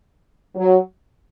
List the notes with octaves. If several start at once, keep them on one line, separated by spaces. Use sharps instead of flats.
F#3